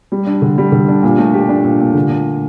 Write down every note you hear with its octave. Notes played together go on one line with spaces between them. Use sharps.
G3
D4
D3
G3
D3
D4
A#2
A3
G4
D4
A#2
A#2
D3
A3